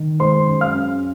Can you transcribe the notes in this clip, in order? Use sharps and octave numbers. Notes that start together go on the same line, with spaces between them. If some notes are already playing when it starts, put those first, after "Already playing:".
Already playing: D#3
G#3 C5 C6
F#2
F5 F6
C#4